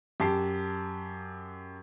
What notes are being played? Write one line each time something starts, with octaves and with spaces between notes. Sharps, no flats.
F#2 G4 A5 C7